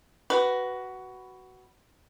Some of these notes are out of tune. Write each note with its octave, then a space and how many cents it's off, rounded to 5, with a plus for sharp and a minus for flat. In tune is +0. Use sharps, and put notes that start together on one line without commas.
F#4 +15 B4 +0